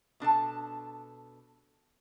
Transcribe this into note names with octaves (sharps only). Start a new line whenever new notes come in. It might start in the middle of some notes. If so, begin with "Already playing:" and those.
B2 D4 A4 A5